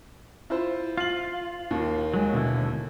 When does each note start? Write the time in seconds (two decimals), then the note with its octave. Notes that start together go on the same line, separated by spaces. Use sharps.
0.50 E4 F4 C5
0.98 F4 F6 F#7
1.71 D#2 D#3
2.14 F#3 G#3
2.34 B2 D3 E4